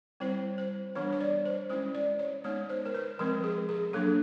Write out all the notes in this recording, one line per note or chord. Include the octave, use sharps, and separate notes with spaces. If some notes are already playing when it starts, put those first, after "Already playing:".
G3 C4 E4 C5
C5
E3 G3 B3 D4 C#5
C#5
D5
C5
G#3 C#4 E4 C5
D5
C#5
G#3 B3 D#4 C#5
C5
A#4
B4
F3 G#3 C4 A#4
G#4
G#4
F#3 A#3 D4 A4